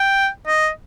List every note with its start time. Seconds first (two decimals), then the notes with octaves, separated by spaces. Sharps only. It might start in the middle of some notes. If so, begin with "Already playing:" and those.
Already playing: G5
0.47 D#5